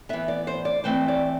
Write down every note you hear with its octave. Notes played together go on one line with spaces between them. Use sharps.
E3 B3 E5
D5
C5
D5
E3 A3 C4 C5
D5